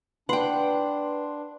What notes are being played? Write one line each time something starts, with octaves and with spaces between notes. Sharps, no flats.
D4 B4 F#5 G5 C6